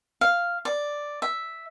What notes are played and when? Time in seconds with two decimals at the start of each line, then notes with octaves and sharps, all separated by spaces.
0.21 F5
0.65 D5
1.22 E5